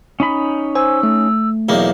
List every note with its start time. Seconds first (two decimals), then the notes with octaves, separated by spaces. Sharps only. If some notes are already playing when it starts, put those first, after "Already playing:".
0.20 C#4 D#4 B5
0.75 C5 G#5 E6
1.03 A3
1.69 B1 E2 A#3 D#5